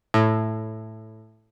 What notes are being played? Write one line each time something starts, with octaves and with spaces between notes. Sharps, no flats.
A2